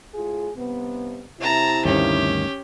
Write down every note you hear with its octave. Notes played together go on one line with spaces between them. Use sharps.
A2 F4 G#4
G2 C3 B3
C3 E4 A5 A#5
D2 G2 D#3 C#4 G4